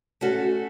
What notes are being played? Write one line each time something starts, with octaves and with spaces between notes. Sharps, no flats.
A3 C#4 F#4 A4